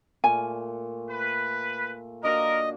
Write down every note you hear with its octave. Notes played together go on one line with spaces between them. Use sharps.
A#2 A3 G#5
B4
A#3 D4 F#4 A#4 D#5